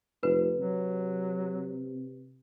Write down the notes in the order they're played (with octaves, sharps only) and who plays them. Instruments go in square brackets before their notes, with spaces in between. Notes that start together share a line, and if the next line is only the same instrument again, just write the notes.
[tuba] F1 [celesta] B4
[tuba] C3 [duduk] F#3